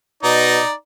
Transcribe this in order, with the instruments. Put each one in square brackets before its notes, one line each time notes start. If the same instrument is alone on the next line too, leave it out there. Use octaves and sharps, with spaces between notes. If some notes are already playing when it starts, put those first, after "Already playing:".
[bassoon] B2 [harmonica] D#4 D5 A#5